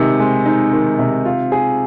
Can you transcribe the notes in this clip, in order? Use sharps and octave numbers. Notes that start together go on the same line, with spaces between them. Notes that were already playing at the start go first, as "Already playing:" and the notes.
Already playing: C3 D#3 G#3 D#4
G#3
D#4
D#3
C3
F4
G#4